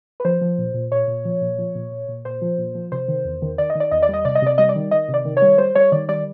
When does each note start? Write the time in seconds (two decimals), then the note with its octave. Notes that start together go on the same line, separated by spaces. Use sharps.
0.20 B4
0.25 F3 C5
0.41 F3
0.58 A#2
0.74 A#2
0.92 A#2 C#5
1.08 A#2
1.25 F3
1.41 A#2
1.58 F3
1.75 A#2
1.91 A#2
2.09 A#2
2.25 A#2 C5
2.42 F3
2.58 A#2
2.75 F3
2.92 C3 C5
3.08 D#3
3.25 E2
3.42 D#3
3.58 D#3 D5
3.70 D#5
3.75 D#3 D5
3.91 E2 D#5
4.02 D5
4.09 G3 D#5
4.25 C3 D5
4.35 D#5
4.42 C3 D5
4.58 G3 D#5
4.69 D5
4.76 D#3
4.91 D#3 D#5
5.09 C3
5.14 D5
5.25 D#3
5.37 C#5
5.42 G3
5.58 G3 C5
5.75 G3 C#5
5.92 D#3 D5
6.09 G3 D5